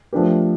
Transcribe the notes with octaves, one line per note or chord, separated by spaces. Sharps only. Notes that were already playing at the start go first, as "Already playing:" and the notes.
F3 A3 D4 G4 A#4